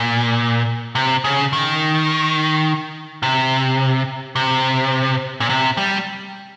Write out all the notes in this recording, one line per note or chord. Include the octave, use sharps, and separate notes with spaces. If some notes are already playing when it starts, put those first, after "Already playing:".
Already playing: A#2
C3
C#3
D#3
C3
C3
A#2
C3
G3